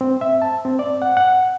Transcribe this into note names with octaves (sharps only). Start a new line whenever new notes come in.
C4
E5
A5
C4
D5
F#5
F#5